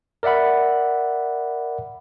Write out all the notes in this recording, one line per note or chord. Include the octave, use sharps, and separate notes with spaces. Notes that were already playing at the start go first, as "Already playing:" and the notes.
A#4 D5 E5 F#5 B5